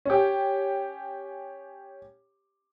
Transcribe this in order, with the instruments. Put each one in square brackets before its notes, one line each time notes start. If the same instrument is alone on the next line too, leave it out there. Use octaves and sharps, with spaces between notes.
[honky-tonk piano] C#4 G4